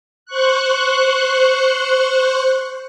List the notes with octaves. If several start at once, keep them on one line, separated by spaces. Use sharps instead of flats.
C5 C#6 F#6